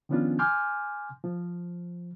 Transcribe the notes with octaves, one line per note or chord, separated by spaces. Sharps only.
D#3 F3 B3 C#4 D4 F4
G#5 C6 D6 F6 G6
F3